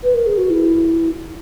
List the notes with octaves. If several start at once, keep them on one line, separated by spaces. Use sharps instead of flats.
B4
A#4
G#4
F#4
E4